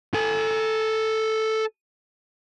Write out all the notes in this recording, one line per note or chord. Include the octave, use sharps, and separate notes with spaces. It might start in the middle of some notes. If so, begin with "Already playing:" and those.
A4 G#5